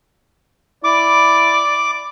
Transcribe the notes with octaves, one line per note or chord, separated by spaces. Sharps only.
E4 D5 D6